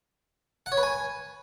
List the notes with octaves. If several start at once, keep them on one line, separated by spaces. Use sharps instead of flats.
F#5
C#5
B4
G#5